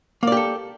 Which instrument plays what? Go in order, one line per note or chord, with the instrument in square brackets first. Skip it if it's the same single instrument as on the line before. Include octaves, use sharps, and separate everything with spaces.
[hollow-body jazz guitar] A#3
D5
G4
A4